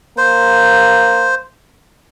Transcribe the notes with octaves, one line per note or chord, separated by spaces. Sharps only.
A#3 C5